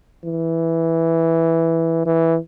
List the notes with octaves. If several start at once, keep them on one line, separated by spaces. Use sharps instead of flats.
E3
E3